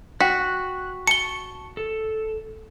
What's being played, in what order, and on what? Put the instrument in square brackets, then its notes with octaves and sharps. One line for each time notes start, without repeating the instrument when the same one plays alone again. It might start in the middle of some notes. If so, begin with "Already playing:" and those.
[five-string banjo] F#4 [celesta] G5 B6 [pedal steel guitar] F#6
[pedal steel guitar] A5 C#6 [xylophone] C#7 G7
[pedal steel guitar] A4